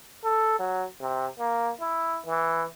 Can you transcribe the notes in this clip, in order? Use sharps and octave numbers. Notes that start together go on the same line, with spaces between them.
A4
F#3
C3
A#3
E4
E3